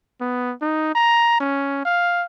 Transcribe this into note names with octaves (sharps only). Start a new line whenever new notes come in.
B3
D#4
A#5
C#4
F5